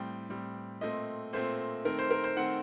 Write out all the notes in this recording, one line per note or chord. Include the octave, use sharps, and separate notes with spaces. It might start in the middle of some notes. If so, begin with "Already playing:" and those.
Already playing: A2 G3 C4 G5
A2 G3 C4
A#2 A3 C4 D#5
A#2 A3 C4 C5
D#3 A3 C4 A#4
C5
A#4
C5
D#3 A3 C4 F#5